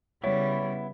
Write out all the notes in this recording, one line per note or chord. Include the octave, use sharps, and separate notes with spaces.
C#3 G3 B3 E4 C#5